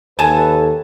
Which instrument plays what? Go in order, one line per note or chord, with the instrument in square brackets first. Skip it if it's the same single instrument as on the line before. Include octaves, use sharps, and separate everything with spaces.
[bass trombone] D#2 [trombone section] A4 B4 [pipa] G#5 A5